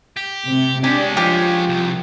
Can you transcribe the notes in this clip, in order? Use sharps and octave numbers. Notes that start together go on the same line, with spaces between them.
G4
C3
G#3 C#4 D4 G4
F3 F4 G4
C2